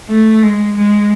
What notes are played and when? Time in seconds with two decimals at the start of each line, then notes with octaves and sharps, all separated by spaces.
0.09 A3
0.43 G#3
0.76 G#3